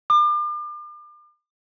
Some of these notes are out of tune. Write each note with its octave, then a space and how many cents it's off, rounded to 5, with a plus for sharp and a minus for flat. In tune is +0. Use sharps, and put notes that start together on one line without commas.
D6 +40